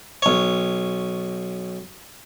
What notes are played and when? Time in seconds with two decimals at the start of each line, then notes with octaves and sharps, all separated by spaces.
0.22 B1 C#5